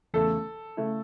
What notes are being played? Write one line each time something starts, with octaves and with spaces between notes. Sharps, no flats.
E2 C#3 A3 E4 A4
C#3 A3 E4